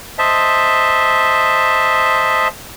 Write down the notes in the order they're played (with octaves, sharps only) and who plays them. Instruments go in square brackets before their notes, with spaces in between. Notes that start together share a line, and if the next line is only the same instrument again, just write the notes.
[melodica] C5 D#5 E5 A5